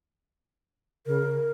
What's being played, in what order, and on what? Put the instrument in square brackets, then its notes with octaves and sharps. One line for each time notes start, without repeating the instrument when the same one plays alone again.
[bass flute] C#3 [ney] A#4